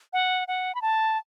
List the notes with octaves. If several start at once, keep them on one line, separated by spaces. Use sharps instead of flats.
F#5
F#5
B5
A5